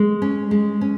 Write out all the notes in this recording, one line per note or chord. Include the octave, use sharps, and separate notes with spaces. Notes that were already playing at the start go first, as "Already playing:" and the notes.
Already playing: G#3
C#4
G#3
C#4